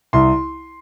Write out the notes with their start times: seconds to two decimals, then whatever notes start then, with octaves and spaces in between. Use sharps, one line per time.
0.13 C2 C6